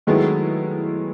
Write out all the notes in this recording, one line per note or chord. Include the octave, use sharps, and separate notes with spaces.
D#3 F#3 G#3 A3 B3 E4